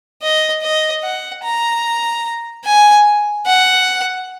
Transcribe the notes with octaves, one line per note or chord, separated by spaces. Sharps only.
D#5
D#5
F#5
A#5
G#5
F#5